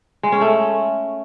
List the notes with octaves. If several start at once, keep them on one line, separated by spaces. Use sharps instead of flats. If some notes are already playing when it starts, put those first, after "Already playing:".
G#3
C#4
A3